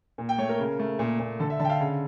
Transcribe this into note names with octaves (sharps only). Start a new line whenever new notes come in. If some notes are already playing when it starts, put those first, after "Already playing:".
A#2
G5
A3 C#5
A#4
C#3
A3
A#2
A#2
D3 A4
E5
D3 A5
G5
F5
C#3